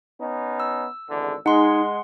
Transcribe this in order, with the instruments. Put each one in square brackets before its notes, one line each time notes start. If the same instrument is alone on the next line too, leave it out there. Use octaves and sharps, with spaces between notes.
[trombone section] B3 C#4 D#4
[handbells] E6
[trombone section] G#1 E2 D3
[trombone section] G#3 [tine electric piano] D#4 [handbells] F#5 C6